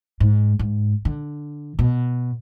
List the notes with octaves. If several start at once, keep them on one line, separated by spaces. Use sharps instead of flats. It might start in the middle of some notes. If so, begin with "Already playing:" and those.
G#2
G#2
D3
B2